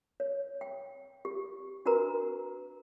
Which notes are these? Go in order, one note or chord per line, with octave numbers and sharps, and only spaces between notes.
C#5
G5
G4
D4 F#4 A#4 B4 A#5